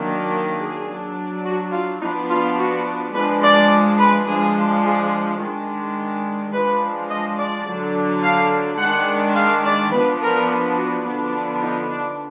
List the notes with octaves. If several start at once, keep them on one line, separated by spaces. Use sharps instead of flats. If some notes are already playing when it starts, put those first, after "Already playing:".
Already playing: D#3 F#3 A#3 D4
G#4
F#3 D4
F#4
F4
F3 B3 D4 D#4
F4
F#4
F3 G#3 D4 B4
D5
B4
F3 G#3 D4 G#4
G#4
D#3 G#3 D4
F3 G#3 D4 B4
D#5
D5
D3 F#3 D4
F5
D#3 G#3 D4 F#5
F5
D5
F3 B3 D4 B4
A#4
F#4
D3 F3 B3 D4
D#4
D4